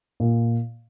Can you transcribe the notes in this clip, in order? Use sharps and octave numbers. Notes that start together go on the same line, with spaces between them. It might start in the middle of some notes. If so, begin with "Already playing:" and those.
A#2